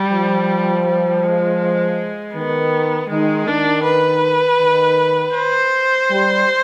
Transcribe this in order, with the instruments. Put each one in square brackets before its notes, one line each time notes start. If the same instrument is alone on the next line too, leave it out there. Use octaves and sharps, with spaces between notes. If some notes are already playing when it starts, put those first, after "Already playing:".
Already playing: [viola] G3
[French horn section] F3
[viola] G3
G#3
[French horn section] D#3 [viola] B3
[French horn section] D#3 [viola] G#3
[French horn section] D#3 [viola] D4
[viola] B4
[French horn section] D#3
[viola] C5
[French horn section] G3